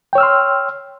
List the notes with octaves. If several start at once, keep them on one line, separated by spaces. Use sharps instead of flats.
C#5 G5 C6 E6 F6